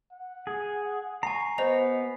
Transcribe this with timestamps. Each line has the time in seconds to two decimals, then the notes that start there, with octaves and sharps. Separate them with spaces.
0.12 F#5
0.47 G#4
1.23 G#5 A#5 C#6 C7
1.58 B3 F#4 C5 D#5 F7